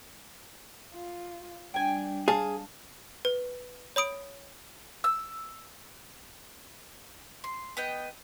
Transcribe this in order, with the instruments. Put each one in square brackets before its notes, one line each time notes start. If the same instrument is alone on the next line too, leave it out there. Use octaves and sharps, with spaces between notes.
[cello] F4
[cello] G3 D4 [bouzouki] G5 G#5
[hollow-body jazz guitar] G#4 [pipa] F5 A5
[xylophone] B4
C#5 B5 D#6 D7
[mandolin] E6
C6
B3 D#5 G5